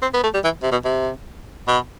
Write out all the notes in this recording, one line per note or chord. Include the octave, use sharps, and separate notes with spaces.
C4
B3
A3
G3
E3
C3
B2
C3
B2